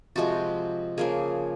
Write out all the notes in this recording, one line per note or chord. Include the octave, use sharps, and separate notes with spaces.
C3 F3 G#3 F#4
C#3 F3 A#3 G#4